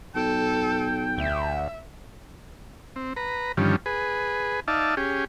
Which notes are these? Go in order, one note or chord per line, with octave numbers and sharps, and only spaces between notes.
B1 A4 G5
D2 E5
C4
B4 A#5
G2 D3 D#3 F3 G3 C#4
G#4 B4
D#4 D5 E5 F5 A5
C#4 G4 G#4